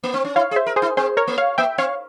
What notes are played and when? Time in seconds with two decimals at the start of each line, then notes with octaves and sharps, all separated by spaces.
0.03 A#3
0.14 C4
0.25 C#4
0.36 E4 C#5 F5
0.51 G#4
0.56 C5 E5
0.66 A#4
0.76 G#4 C5
0.82 E4
0.97 C4 G#4 C5
1.17 A#4 C#5
1.28 A#3
1.38 C#5 F5
1.58 A#3 E5 G5
1.78 C4 C#5 F5